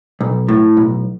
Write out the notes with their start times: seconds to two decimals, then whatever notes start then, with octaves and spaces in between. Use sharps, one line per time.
0.21 B1
0.48 A2
0.77 B1